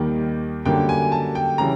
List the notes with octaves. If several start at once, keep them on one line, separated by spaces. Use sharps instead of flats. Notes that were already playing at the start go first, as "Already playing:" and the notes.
Already playing: D#2 D#3 G3 A#3
F#2 D3 G3 A#3 G5
G#5
A5
G5
C#3 E3 G3 A#5